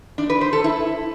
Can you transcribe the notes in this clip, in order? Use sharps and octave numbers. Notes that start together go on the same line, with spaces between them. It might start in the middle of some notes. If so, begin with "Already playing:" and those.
D4
B4
C5
A4
E4